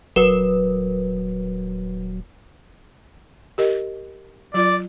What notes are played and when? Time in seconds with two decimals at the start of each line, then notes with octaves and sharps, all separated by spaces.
0.16 D#1 F#3 A#4 B4
3.58 G4 A#4 D#5
4.54 F#3 F4 D5